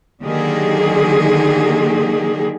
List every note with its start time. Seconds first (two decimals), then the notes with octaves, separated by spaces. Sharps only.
0.23 D3 D#3 F#3 A#3 G4 G#4